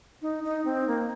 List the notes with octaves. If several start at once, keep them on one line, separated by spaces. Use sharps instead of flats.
D#4
D#4
C4
A#3